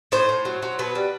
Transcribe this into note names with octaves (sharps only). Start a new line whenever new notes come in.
A2 C5
A2
F#3
F#3
B2 B4
G3